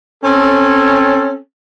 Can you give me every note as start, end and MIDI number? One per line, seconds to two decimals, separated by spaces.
0.24 1.37 60
0.24 1.37 61
0.24 1.37 69